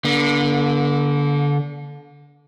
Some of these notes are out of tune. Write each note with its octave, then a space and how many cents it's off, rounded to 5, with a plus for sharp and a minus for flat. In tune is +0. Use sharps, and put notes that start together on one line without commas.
D3 -25 A#3 +40